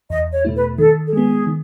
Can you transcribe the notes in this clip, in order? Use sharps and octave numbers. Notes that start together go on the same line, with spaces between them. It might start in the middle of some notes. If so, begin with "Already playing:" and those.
E2 D#5
C#5
B2 A3 E4
B4
D#3 A4
A4
G#3 B3 G#4
D#3